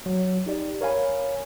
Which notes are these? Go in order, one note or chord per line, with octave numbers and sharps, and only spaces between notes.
F#3
D#4 G4 D5
A#4 C#5 F5 G#5 B5